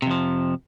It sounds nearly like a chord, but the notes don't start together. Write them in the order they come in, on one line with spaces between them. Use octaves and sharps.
C3 F2 F3